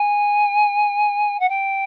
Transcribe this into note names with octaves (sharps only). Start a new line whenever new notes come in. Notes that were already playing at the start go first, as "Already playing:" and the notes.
Already playing: G#5
F#5
G5